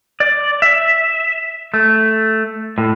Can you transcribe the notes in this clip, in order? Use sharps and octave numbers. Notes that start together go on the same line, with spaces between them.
D5
E5
A3
A2